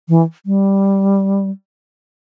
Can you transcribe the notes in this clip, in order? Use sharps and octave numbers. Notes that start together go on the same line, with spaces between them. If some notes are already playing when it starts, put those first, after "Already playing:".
E3
G3